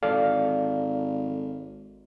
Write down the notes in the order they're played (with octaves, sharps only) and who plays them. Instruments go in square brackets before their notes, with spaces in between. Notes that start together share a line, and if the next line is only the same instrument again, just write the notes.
[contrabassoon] G#1 [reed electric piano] A4 D5 F5